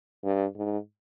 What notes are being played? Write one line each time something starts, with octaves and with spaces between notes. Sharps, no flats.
G2
G#2